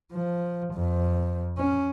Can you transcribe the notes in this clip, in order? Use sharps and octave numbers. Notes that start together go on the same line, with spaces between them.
F3
F2
C#4